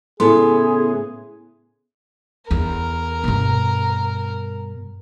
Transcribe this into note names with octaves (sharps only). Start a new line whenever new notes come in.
A2 C#3 B3 E4 G#4 A4 C6
E2 A#4
G2 B2